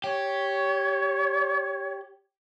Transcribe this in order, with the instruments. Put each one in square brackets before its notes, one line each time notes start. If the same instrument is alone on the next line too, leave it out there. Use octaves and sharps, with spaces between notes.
[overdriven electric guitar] G4 [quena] C#5